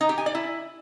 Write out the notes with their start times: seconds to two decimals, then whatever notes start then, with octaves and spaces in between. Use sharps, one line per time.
0.01 D#4
0.09 G4
0.18 G#5
0.26 D5
0.35 E4